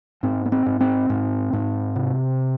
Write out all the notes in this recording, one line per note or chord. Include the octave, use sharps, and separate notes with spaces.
G#2 C4
B3
C4
G#2
C4
G#2
G#2
C3